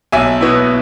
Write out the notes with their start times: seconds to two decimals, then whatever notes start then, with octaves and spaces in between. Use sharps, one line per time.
0.12 B1 E5 G#5
0.41 B2 B3 E4